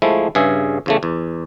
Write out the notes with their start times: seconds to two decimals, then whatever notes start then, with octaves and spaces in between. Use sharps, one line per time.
0.02 F3 G#3 A3 E4
0.35 G2 C#3 G#4 E5
0.86 E2 C#3 A3
1.03 E2